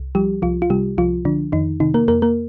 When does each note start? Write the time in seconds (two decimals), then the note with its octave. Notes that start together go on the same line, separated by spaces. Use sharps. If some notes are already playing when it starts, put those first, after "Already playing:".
Already playing: C2
0.15 F3 G3 G4
0.42 C2 F3 F4
0.62 F4
0.70 C3 G3 G4
0.98 C2 F3 F4
1.25 D3 F3 D4
1.52 F2 D#3 D#4
1.80 C3 D#3 D#4
1.94 A#3 A#4
2.08 F2 A#3 A#4
2.22 A#3 A#4